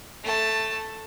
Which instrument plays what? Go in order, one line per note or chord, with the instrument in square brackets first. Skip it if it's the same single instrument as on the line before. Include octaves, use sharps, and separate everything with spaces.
[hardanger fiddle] A3 A5